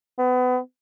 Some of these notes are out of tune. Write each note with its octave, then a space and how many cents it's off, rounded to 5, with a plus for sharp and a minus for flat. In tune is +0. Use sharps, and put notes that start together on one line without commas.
B3 +30